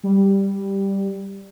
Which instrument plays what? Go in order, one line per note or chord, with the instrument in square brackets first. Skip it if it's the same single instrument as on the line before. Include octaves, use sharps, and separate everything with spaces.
[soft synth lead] G3